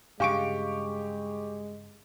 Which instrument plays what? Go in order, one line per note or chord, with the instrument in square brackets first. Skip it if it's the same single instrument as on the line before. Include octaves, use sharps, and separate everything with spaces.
[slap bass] G2 C#3 [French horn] G#3 [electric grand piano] G4 C#6 D7 [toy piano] F5 G#5